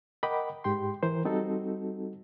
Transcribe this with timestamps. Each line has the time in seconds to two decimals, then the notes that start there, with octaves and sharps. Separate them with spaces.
0.23 A#4 D#5 F#5 G5 B5 D6
0.64 G#2 G4 G5 C6
1.03 E3 A#4 C5
1.25 G3 C4 D#4 F#4 A4